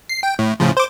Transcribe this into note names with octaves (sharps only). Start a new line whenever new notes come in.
C7
G5
A2
A2 C#3 F3
C5 D6